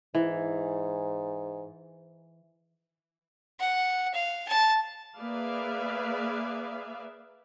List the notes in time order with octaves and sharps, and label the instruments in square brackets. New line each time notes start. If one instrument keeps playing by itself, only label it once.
[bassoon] G#2 [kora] E3
[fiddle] F#5
F5
A5
[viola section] A#3 G#4 B4 D5 E5 F5